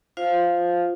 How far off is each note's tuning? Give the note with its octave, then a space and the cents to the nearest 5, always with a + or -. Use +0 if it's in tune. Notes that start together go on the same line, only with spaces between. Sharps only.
F4 +5 C5 +0 F5 +0